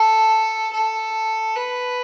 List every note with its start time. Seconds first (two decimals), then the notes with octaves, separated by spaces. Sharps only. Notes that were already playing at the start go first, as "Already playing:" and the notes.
Already playing: A4
0.73 A4
1.56 B4